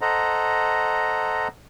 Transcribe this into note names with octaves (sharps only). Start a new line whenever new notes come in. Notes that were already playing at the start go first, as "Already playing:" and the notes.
A4 C5 D#5 F#5 A#5